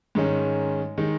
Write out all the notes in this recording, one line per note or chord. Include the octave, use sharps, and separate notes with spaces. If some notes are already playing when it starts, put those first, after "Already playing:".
G#2 D#3 G#3 C#4
D#3 G#3 D#4